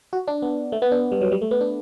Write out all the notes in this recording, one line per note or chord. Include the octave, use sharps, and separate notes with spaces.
F#4
D4
B3
A3
B3
D4
G3
F#3
G3
A3
B3
D4